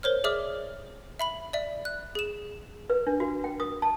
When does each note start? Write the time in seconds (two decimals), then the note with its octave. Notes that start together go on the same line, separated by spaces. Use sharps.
0.03 A#4 C5 C#5 F6
0.24 G#4 D5 E5 D6 F6
1.19 E5 B5 F#7
1.53 D5 E5
1.85 F#6
2.15 G#4 E7
2.90 B4
3.07 D4
3.20 F#4
3.44 G5
3.60 D#6
3.82 A5